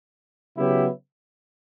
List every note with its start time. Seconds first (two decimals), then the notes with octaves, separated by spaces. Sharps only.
0.57 C#3 F#3 B3 E4 G4